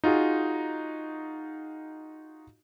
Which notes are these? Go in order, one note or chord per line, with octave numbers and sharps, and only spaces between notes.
D#4 F4 F#4 G#4